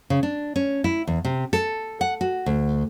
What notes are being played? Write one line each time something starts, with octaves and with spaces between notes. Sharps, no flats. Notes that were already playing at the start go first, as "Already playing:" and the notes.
C#3
D4
C#4
E4
E2
C3
A4
F#5
F#4
D2